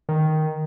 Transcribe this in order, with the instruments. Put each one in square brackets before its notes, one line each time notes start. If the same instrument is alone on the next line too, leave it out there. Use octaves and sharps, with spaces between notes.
[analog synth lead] D#3